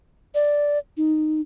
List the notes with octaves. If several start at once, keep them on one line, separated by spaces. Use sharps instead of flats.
D5
D#4